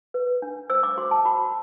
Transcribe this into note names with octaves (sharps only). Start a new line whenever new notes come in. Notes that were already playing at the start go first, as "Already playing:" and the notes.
B4
D4
C5 E6
D6
F#4 C6
A5
F#4 B5